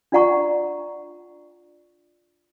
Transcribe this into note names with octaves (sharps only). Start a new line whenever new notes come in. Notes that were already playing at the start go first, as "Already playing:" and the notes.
D4 F4 D5 F#5 A#5 C#6